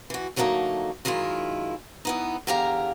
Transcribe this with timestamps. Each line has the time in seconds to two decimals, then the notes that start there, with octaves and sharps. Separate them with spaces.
0.10 E3 F#4
0.36 D3 F#3 G3 A3 A#3 D#4
1.05 F#2 D#3 G#3 E4 F4
2.05 E3 B3 D#4
2.47 E2 D3 G4 A#4 F5 A#5